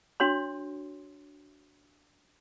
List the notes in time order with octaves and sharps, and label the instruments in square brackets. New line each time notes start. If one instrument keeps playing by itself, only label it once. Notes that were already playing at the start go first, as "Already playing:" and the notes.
[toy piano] D4 F#4 C#5 C6